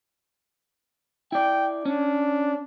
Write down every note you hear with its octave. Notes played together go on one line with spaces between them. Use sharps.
E4 D5 G5
C#4 D4